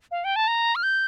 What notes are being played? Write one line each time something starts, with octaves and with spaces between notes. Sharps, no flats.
F5
G5
A5
A#5
F6
G6